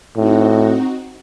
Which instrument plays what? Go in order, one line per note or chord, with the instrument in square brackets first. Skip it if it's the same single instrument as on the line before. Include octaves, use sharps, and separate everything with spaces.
[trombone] A2 [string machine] C4 D#4 F#4